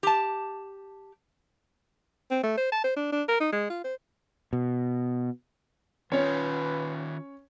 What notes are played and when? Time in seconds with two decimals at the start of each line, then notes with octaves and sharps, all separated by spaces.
0.03 G4 A5
2.31 C4
2.43 A3
2.58 C5
2.72 A5
2.84 C5
2.96 D4
3.12 D4
3.28 A#4
3.41 D#4
3.52 G#3
3.70 F4
3.84 C5
4.53 B2
6.12 D#3 C#4 F4 B4 C#5